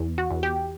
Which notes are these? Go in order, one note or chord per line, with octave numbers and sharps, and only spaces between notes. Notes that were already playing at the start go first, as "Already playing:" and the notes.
Already playing: E2
F#4
E2
G4